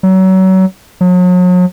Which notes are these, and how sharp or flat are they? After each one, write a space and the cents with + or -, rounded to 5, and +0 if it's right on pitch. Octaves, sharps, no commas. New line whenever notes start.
F#3 +30
F#3 -40